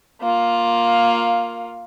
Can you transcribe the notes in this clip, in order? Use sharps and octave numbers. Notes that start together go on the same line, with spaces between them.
A#3 F4